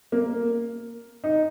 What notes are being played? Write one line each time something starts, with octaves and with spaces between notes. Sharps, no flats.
A#3
D#4